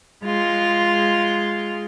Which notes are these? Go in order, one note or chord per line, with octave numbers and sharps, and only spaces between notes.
G#3 F4